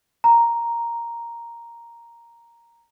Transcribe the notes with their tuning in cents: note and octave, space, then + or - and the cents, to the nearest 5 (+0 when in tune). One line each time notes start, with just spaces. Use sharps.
A#5 +0